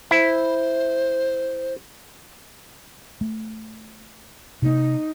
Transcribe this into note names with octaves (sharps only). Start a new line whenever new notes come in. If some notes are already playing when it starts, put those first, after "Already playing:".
E4 C5
A3
C3 A#3 D#4